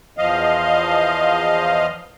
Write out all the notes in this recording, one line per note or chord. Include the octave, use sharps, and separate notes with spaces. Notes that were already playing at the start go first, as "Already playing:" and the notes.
E2 F3 D#5 F5